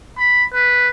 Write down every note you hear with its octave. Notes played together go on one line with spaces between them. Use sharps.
B5
B4